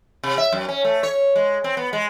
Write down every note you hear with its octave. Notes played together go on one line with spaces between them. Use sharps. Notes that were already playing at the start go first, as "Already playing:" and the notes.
C3
E5
F#2
C#4
A3
C#5
G#3
C4
B3
G#3